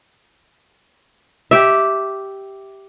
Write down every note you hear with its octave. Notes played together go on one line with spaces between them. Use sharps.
G4 E5